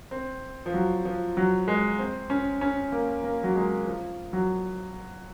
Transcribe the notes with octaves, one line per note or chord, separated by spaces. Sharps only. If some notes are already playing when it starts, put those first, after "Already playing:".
C4
F3
F#3
F3
F#3
G#3
C4
C#4
C#4
A#3
A#3
F#3
G#3
F3
F#3